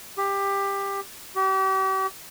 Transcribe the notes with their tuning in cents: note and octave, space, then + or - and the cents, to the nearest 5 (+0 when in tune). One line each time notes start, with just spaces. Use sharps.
G4 +15
G4 -40